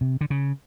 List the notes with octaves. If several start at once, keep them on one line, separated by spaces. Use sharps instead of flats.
C3
D3
C#3